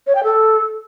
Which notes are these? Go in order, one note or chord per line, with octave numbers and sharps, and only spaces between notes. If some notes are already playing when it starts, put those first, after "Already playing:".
C#5
G5
A4